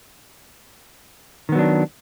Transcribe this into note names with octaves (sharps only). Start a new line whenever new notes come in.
D#3 F#3 B3 D4